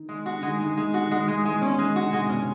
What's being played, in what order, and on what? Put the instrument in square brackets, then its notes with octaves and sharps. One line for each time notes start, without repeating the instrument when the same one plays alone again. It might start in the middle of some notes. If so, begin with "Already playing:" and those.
Already playing: [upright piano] D#3
[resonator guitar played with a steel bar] G#3
F#4
[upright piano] D3
[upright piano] D#3 [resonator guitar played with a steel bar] G#3
[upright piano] D#3 [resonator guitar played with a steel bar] G#3
[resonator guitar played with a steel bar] G#3
[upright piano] D#3 [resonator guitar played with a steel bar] F#4
[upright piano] D#3 [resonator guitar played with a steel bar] G#3
[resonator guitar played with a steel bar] G#3
[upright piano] E3 [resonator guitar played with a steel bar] G#3
[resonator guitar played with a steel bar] C#4
[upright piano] D#3 [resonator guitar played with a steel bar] G#3
[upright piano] D3 [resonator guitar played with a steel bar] F#4
[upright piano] C3 [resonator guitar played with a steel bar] G#3
[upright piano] B2 [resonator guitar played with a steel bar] C#4